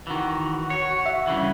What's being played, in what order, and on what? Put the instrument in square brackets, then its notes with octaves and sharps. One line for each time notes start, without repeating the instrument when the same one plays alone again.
[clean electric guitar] D#3 E3 [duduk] F#4
[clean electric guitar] C#5
[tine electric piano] E5
[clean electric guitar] G2 C#3 E3